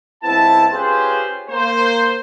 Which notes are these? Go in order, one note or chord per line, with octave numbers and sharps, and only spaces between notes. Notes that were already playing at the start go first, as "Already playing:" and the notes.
C#2 B3 C4 E4 A5
C#4 F4 G4 G#4 B4 C5
A#3 C5